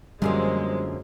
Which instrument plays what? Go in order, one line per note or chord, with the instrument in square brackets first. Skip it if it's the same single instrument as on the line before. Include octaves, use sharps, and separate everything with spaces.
[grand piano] F#2 G#4 A#4 [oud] D3 F3 A#3 [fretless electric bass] G3 [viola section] G#3